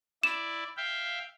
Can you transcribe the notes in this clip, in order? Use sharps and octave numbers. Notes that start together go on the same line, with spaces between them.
E4 D5 E7
E5 F5 G5